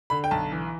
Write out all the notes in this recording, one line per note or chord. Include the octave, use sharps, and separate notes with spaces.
D3 B5
G5
B1 A5
E3